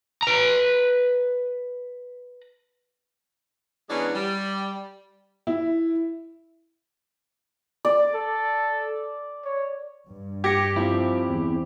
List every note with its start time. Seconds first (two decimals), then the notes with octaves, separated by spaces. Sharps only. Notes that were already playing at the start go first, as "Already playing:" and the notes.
0.23 B4 A#5
3.89 E3 F#3 G#3 B3 C#4 D4
4.14 G3
5.47 E4
7.85 D5
8.15 A4
9.45 C#5
10.07 G2
10.44 G4 G#6 A#6 C#7
10.76 F3 C4 E4
11.30 E2